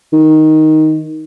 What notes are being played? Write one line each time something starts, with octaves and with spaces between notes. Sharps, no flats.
D#3